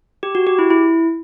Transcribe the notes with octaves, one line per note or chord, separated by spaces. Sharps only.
G4
F#4
G4
E4
E4